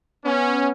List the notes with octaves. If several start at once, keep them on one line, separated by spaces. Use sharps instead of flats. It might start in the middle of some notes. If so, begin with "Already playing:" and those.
B3 C#4